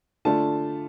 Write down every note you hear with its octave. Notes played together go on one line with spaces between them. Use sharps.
D3 A3 D4 F4 A5